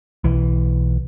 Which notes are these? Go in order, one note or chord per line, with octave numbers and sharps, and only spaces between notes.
B1 E3